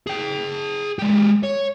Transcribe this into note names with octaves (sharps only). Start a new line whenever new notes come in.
G#4 G5
G#3 G4
C#5